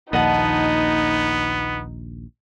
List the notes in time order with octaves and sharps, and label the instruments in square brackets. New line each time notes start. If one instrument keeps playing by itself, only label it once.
[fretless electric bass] A#1 D#2 [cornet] B3 [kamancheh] D#4 [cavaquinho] D#5 F#5 A5